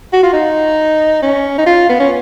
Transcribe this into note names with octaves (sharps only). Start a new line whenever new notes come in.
F#4
F4
D#4
C#4
D#4
F4
B3
C#4